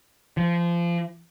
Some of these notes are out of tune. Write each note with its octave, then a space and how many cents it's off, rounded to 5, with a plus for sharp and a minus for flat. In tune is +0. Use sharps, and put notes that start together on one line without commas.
F3 -25